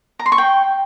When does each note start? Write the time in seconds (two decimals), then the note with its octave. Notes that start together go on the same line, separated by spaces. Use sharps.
0.19 A#5
0.26 C6
0.32 C#6
0.38 G5